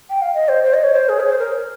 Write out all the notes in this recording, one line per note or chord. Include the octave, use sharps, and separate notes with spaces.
G5
F5
D#5
C5
C5
D#5
C#5
C5
G#4
C#5
C5
A#4